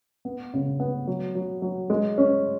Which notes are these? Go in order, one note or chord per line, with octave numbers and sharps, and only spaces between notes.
B3
C#3
B3
F#3
F#3
F#3
G#3
C#4